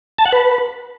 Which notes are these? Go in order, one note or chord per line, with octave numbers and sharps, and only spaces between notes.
A5
F#5
B4